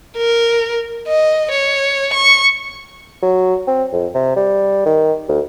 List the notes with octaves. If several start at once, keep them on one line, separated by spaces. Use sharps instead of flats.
A#4
D#5
C#5
C#6
F#3
C4
F2
C3
G3
D#3
D2